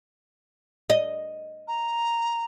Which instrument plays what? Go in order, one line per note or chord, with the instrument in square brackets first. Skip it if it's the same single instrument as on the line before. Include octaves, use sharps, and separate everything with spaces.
[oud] D#5
[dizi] A#5